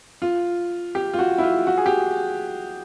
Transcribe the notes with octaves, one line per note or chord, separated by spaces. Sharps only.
F4
G4
F4
F#4
E4
F4
F#4
G#4
G4